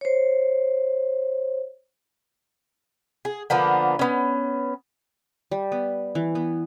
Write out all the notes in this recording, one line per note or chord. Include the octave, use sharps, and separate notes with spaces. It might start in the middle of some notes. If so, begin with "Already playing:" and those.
C5 C#5
G#4
D3 F3 A#3 B3
B3 C#4
G3
B3
E3
B3